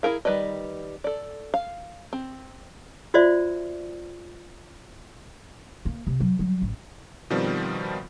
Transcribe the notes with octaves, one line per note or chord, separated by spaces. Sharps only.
E4 G#4 A#4 F5
D#3 G3 B4 D5 D#5
A4 D5
F5
C4
F4 F#4 C5 D5 E5
A#3
C3
F#3
F#3 G3
A1
B2 D#3 F3 G3 C4